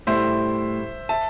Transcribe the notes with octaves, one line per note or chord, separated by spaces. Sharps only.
A2 G3 E4 C5 E5
E5 A5